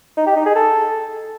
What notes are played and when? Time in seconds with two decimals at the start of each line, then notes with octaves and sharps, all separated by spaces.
0.17 D#4
0.27 G4
0.36 D#4
0.46 G#4
0.55 A4